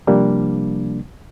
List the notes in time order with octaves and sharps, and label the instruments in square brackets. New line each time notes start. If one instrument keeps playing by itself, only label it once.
[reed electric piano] C3 F3 G3 A#3 D4